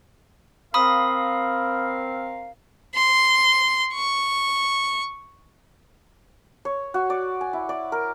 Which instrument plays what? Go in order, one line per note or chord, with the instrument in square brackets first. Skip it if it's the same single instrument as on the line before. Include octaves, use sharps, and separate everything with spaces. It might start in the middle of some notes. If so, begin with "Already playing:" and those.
[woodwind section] C4 A#4 F5 [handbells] B5 D#6
[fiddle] C6
C#6
[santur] C#5
F#4
D5
G#5
E4
D5
A#4